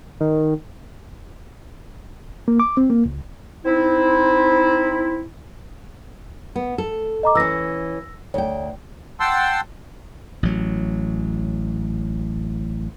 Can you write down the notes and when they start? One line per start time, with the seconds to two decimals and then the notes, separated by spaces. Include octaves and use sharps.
0.20 D#3
2.48 A#3
2.60 D6
2.77 C4
2.90 A#3
3.06 C#2
3.66 C4 D#4 E4
6.56 B3
6.78 A4
7.23 D#5 A#5 D6
7.35 E3 C#4 E6 A#6
8.34 D2 C#5 G5
9.20 F#5 G5 A5 C6 E6
10.43 A1 F#3